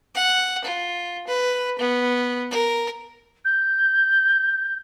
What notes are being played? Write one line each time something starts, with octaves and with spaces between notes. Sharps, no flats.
F#5
F4
B4
B3
A#4
G6